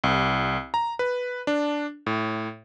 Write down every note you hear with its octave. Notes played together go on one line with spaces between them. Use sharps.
C2
A#5
B4
D4
A2